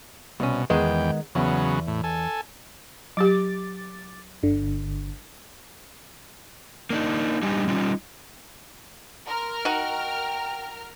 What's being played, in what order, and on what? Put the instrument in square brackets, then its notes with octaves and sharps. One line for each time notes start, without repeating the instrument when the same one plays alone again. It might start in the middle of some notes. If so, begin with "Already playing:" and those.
[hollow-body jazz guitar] C2 C#4 [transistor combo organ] B2
[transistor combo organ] E2 G5 [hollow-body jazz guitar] D#3 G#3 B3
[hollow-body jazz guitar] E2 [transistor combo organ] C#3 F#3 B3
[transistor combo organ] A2
A4 G#5
[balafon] F#3 G4 [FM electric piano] D6 A6
[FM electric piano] G1 D3
[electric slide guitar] A#3 D4 D#4
G3 D4 D#4 G4 G#5
G3 C#4 D#4 F4
[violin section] A#4 A#5 F6 [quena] C6
[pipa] D#4 F#4 [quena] G5